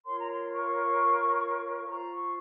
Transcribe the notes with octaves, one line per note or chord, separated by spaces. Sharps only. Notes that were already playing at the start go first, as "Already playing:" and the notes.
F4 A#4 C#5 C6
A#5
C6
C#6
F4 C5 A#5
C#6